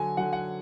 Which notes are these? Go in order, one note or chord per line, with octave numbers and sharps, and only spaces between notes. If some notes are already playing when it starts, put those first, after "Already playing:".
Already playing: D3 F#3 G#5
D3 F#3 F#5
F#5